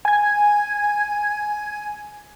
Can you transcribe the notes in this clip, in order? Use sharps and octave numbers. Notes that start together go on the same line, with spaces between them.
G#5 G#6